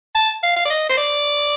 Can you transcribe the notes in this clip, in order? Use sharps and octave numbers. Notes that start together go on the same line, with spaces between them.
A5
F5
F5
D5
D#5
C5
D5